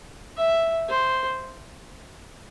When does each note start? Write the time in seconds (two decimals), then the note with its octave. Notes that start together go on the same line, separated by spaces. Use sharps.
0.37 E5
0.89 C5